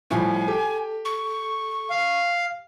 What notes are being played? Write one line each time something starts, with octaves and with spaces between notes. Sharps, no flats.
A2 F3 G3 G#5
G4 A4 G5
C#6
F5